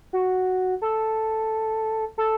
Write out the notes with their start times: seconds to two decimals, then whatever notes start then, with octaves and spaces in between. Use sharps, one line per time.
0.13 F#4
0.82 A4
2.18 A4